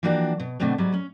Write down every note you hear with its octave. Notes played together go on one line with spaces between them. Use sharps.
E3 F3 A#3 D4 F#4 G4
B2
B2 D3 A3 B3 C4 D4
G#2 F#3 G3
C#4